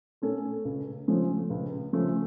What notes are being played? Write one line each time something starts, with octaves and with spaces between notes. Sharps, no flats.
A3 C#4 A4
C#2
C#3 F3 A3 C#4
C#2
C#3 F3 A3 C#4